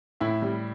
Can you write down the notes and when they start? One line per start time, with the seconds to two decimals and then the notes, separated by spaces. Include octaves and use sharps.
0.20 A2 E4 E5
0.42 G3